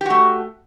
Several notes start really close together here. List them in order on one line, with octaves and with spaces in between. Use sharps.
G4 F#4 A3